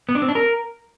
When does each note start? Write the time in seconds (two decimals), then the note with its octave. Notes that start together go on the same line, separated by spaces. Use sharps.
0.09 B3
0.15 D4
0.22 C4
0.29 D4
0.35 A#4